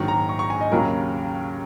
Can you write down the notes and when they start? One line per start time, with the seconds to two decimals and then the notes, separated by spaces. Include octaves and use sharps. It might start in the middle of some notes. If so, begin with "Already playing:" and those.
Already playing: A#1 G#2 D#3 F#3 C#6
0.08 A#5
0.29 C#6
0.39 C#6
0.50 G#5
0.61 D#5
0.72 D#2 C#3 F#3 A#4